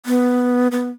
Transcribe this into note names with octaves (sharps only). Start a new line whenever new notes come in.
B3
B3